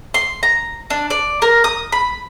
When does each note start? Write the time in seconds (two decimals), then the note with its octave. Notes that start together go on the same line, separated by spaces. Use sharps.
0.14 C6
0.43 A#5
0.90 D4
1.10 D5
1.42 A#4
1.64 D#6
1.92 B5